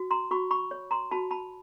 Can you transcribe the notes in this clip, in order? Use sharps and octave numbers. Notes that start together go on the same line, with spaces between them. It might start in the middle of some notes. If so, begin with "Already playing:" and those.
Already playing: F#4
A#5 C6
F#4 B5 C#6
B5 C#6
C#5
A#5 C6
F#4 A5 B5
A5 B5